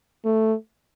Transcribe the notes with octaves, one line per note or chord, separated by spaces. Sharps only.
A3